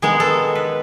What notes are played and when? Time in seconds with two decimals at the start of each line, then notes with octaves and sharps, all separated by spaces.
0.02 D#3 G#3 B3 G#4
0.20 A4
0.55 B4